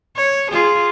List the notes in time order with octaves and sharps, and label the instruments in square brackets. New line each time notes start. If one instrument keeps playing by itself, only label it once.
[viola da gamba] C#5
F4 G#4